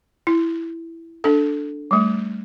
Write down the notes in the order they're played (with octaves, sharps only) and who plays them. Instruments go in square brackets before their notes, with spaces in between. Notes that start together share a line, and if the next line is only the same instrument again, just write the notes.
[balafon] E4
D4 A4
G3 A3